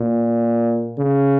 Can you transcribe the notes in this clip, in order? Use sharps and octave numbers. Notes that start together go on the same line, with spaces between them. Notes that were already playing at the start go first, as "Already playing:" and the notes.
Already playing: A#2
C#3